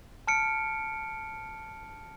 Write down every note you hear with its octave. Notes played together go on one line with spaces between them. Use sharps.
A5 F6 C#7 D7